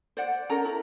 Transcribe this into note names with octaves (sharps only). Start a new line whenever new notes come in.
C5 D5 F#5
C#4 A4 A#4 A#5
E4